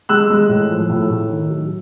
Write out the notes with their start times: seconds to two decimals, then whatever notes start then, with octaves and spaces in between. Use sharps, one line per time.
0.09 G#3 E6 F#6
0.30 G#3
0.49 A2
0.69 F3
0.90 A2
1.10 A2
1.30 D#3
1.50 F#3